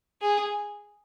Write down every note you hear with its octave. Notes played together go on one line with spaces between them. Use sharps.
G#4